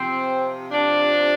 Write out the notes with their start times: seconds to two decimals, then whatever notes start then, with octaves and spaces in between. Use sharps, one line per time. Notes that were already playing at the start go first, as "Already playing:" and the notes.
Already playing: C3 F3 C4
0.70 D4